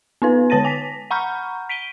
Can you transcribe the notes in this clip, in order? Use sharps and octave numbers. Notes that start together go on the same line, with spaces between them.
B3 D#4 B4
D3 C#5 A5 A6 A#6 D#7
G#5 A#6 B6
F#5 A#5 B5 C#6 F6 G6
B6 D7 D#7 G7